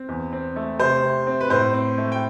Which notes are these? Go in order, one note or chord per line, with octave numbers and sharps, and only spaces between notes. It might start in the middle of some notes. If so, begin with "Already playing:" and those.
Already playing: C4
E2
C4
A3
C3 C5
C3
C4
B4
A2 C5
C4
A3
G5